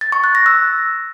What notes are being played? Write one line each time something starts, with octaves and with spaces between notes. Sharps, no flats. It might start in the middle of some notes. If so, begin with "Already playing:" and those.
A6
C#6
F#6
A#6
E6